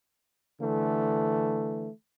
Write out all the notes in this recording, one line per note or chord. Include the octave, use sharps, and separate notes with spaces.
D3 E3 A3